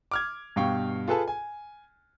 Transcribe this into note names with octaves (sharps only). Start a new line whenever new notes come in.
D6 F6 G#6
G2 B2 F5 G5 C#6
F4 G#4 A4 B4 G#5 A5
G#5